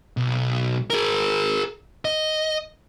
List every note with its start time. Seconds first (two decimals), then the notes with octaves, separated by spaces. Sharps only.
0.17 B1
0.90 G#4 A#4
2.05 D#5